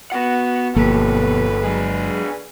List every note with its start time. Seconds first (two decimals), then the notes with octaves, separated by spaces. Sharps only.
0.12 B3 F#4 F#5
0.76 G1 F#2 B2 F3 A3 A#3 G4 B4
1.64 F#3 G#3 D4 G#4